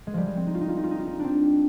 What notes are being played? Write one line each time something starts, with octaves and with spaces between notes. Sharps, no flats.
G#3
F3 G3
G#3
C4
D#4
F4
D#4
F4
D#4
F4
D#4
F4
D#4
C4 D4